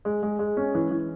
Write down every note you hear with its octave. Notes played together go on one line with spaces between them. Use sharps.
G#3
G#3
G#3
C#4
E3
E3